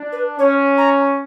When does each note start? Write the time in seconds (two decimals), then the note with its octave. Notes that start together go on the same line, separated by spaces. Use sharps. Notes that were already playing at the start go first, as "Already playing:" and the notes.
Already playing: D4
0.12 B4
0.39 C#4 C#5
0.78 A#5